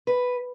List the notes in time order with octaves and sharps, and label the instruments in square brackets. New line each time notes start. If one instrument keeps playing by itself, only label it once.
[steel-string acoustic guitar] B4